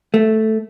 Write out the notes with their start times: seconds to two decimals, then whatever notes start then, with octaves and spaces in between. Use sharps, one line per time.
0.14 A3